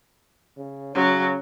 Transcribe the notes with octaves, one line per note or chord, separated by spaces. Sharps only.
C#3
C#3 F#3 C#4